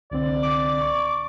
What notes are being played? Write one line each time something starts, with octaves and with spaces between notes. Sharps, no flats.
C2 D3 C4 D5
D6
C#6